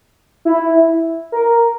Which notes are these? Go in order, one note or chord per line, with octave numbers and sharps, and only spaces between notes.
E4
A#4